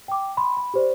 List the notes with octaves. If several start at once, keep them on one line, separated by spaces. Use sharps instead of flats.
G5 D6
B5 C6
B5
G4 C5 D5